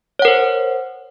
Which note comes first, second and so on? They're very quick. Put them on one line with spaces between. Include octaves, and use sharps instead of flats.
C#5 F#5 A#4 C5